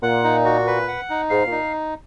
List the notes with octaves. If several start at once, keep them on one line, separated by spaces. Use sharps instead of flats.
A#2 F#5
D#4
F#4
B4
F#5
D#4
G#2 F5
A#2
D#4